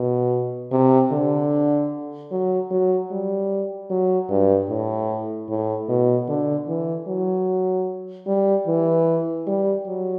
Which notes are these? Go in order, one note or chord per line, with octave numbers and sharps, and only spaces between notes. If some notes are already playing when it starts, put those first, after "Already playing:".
Already playing: B2
C3
D3
F#3
F#3
G3
F#3
G2
A2
A2
B2
D3
E3
F#3
G3
E3
G3
F#3